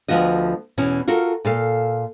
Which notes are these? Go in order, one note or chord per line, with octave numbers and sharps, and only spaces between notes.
D2 D#3 F3 B3 F#4 D#5
E2 B2 E3 C#4
F4 F#4 A4 A#4
A#2 A4 F5